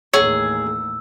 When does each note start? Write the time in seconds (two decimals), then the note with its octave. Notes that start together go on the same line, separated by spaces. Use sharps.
0.14 A1 D#2 G#4 C#5 E6